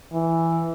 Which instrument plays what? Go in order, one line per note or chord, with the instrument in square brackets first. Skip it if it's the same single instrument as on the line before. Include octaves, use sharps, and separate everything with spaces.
[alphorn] E3